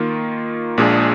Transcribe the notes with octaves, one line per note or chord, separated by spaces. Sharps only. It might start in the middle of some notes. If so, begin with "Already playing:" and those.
Already playing: D#3 A#3 F4
A#1 A#2 G#3 D4 G#4